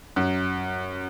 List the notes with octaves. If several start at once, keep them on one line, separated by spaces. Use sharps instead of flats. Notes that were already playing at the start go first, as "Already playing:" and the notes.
F#2